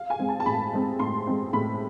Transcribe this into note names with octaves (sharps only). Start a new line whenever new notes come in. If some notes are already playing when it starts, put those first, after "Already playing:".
Already playing: F5
G#5
G#3 C4
A5
A5
A2 B5
G#3 C4
A2 C6
G#3 C4
A2 B5